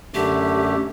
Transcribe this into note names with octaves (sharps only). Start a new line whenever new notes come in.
F#2 D3 A3 G4